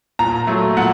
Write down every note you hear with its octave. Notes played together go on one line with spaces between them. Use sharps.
A#2 A#5
F#3 A3
A#2 F#5